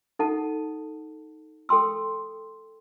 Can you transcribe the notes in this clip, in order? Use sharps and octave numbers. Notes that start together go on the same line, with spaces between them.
D#4 A4 F#5 A5
A4 G5 C6 E6